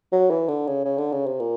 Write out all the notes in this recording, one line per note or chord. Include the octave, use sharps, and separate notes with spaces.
F#3
E3
D3
C#3
C#3
D3
C#3
C3
A#2